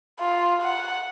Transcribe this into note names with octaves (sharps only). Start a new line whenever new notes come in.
F4
F#5